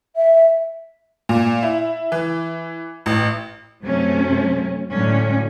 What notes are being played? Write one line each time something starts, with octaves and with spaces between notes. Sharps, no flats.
E5
A#2
E4
E3
A1
F#2 C3 F#3 A3 C#4
A2 D3 F#3 C#4